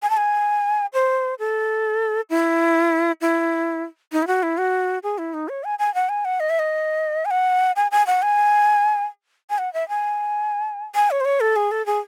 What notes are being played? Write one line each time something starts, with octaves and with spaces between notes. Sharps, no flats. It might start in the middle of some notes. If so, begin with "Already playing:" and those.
G#5
A5
G#5
C5
A4
E4
E4
D#4
E4
F#4
E4
F#4
G#4
E4
D#4
C#5
G#5
G#5
F#5
G#5
F#5
D#5
E5
D#5
G#5
F#5
G#5
G#5
F#5
G#5
G#5
F#5
E5
G#5
G#5
C#5
C5
C#5
A4
G#4
A4
G#4